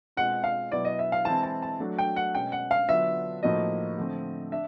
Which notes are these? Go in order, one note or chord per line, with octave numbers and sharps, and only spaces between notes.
B2 G#3 C4 F4 F#5
F5
B2 F#3 B3 E4 D5
D#5
E5
F5
E3 G#3 C4 E4 A5
A5
A5
F#3 A3 D4 F#4
G5
F#5
B2 G#3 C#4 G5
F#5
F5
D3 F#3 B3 D4 F4 E5
A2 F3 A#3 D#4 F#4 D#5
D3 F3 A3 C4
D4 E5